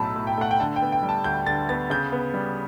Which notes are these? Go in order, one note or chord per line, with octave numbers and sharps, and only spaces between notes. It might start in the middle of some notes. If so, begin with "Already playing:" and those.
Already playing: B1 A2 F#3 A3 A5 B5 E6
A2
G5
A3 F#5
G5
D3 A5
G5
B3
G5
G3
A5
D2 G6
D3 A6
B3 A6
C#3 G6
B3
G3